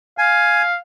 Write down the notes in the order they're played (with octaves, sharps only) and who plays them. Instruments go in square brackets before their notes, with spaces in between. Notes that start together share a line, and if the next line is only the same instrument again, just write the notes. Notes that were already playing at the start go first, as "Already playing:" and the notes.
[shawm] F5 [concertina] G#5